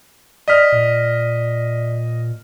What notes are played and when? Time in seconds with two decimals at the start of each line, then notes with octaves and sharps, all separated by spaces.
0.48 D5 D#5 D#6 F6 B6
0.72 A#2